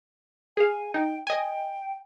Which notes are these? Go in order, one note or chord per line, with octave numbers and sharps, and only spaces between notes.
G#4 F5 G#5
D#4 G5
D#5 G5 G#5